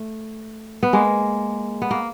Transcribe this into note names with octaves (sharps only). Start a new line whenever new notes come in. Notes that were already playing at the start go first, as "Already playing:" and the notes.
Already playing: A3
B3
G#3 A#3
B3
A#3